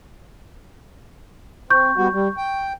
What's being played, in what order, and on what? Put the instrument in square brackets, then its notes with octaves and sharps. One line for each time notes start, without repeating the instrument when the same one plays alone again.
[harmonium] C4 [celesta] C#6 G6
[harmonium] G3 B3 F#4
G3
G5